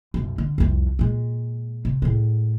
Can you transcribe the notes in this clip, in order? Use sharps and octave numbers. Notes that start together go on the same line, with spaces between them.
B1 F#2
D3
C2 F2
A#2 G#3
C3
A2 G#3